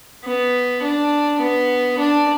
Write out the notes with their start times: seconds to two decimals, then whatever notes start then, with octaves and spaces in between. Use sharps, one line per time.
0.24 B3
0.82 D4
1.40 B3
1.98 D4